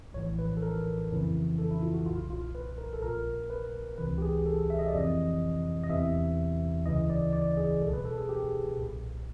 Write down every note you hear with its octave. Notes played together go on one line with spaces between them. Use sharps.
A#1 A2 E3 C#5
B4
A4
A#4
F2 C#3 E3
A4
E4
F4
F#4
B1 A#2 F4
F4
B4
A#4
A4
A#1 A#2 A#4
B4
C#2 C3 E3 B4
G4
G#4
A4
E5
D#5
D5
F2 C3 E3 D#5
D#5
E2 C3 E3 E5
D2 C#3 E3 D#5
D5
D5
G#4
C2 B2 A4
B4
A4
G#4
G4
B1 A#2